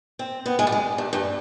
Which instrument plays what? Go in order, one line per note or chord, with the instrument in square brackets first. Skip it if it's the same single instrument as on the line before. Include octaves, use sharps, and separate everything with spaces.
[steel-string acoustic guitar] C4
B3
G#3
G3
G#3
G2
G2